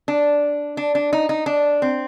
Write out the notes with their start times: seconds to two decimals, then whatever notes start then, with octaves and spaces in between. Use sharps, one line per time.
0.08 D4
0.77 D4
0.95 D4
1.13 D#4
1.29 D#4
1.46 D4
1.82 C4